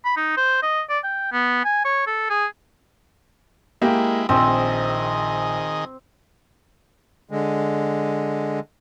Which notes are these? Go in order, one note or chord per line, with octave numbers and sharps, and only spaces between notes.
B5
D#4
C5
D#5
D5
G5
B3
G#5
C#5
A4
G#4
G#3 A#3 E4 G4
A#1 D#3 C4 G#4 D#5
D3 G#3